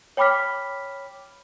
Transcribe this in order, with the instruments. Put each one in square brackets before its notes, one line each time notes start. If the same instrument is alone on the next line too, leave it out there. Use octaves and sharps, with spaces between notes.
[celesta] C#5 G5 B5 D6 F6 B6